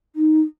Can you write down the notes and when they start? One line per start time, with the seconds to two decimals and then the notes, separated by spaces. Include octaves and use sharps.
0.16 D#4